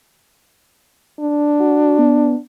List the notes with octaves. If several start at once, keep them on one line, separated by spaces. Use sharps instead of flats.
D4
F#4
B3